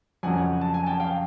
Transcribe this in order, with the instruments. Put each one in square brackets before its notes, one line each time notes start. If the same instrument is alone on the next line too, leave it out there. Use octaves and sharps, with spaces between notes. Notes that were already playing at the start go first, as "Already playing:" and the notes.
[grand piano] F2 C#3 F#3 F#5 G#5
A5
G#5
G5 A5
F5 G5